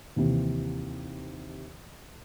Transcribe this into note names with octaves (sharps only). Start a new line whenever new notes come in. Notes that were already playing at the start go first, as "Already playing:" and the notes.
D#2 C3 E3